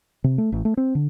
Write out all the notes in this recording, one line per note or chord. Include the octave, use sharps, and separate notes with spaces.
C3
A3
A1
A3
C4
D3